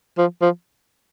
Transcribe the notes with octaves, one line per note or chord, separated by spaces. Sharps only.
F3
F3